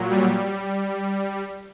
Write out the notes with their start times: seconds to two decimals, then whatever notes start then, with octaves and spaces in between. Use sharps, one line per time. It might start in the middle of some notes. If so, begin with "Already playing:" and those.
Already playing: A#2 F#3
0.10 G3